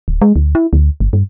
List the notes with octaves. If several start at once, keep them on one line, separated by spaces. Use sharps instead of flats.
D1
G#3
D2
E4
D2
G1
G2